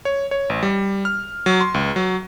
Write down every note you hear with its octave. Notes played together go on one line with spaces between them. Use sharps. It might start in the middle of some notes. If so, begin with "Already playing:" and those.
C#5
C#5
A1
G3
F6
F#3
C6
C#2
F#3